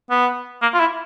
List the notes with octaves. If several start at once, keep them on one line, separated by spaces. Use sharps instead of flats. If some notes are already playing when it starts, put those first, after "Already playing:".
B3
A#3
F4
E4